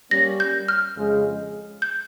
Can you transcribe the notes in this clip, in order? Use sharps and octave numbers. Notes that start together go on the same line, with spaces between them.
G3 A#3 C#4 A#6
G6
F6
F2 C#3 G#3
G6